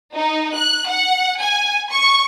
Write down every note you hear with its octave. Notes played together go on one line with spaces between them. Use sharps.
D#4
F#6
F#5
G#5
C#6